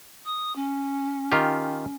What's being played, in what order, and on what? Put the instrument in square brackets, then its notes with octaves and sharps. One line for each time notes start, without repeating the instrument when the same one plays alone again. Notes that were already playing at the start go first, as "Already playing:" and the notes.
[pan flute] D#6
C#4
[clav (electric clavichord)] D#3 F4 G4